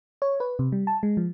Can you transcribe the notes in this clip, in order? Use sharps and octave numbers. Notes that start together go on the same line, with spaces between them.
C#5
B4
C3
G3
A5
G#3
F3